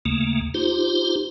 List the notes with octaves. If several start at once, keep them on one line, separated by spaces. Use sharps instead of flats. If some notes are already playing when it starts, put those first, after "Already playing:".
D#2 C#3 A3 A#3
D#4 F4 G4 C5